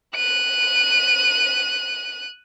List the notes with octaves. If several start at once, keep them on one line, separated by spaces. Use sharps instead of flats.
F#6 D#7